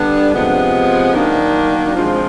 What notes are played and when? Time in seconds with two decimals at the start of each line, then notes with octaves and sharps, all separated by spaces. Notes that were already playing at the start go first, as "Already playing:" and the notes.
Already playing: D3 G3 B3 D4
0.33 C3 F3 G#3 B3
1.14 D#3 F#3 A#3 D4
1.94 F3 G#3 C4 F4